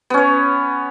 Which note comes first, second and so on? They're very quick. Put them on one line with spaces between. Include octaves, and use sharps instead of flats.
B3 C#4 C#5